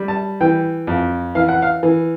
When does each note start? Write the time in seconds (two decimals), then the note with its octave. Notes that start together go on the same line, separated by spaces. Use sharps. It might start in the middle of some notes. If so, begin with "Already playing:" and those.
Already playing: G3
0.08 A5
0.41 E3 G5
0.87 F2
1.35 E3 F5
1.48 F#5
1.62 F5
1.83 E3